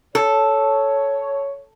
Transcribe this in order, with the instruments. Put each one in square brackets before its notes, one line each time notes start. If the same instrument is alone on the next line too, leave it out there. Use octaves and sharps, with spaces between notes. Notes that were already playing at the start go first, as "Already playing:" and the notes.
[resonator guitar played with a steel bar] A4 [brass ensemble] C#5